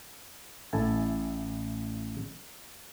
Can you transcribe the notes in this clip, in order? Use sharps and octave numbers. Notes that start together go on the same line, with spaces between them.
A1 E4 A4 G#5 A5